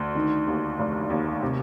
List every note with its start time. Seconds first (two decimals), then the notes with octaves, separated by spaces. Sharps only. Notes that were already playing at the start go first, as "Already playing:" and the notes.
Already playing: D2
0.15 D#3
0.47 D#2
0.79 F1
1.10 D#2
1.42 C3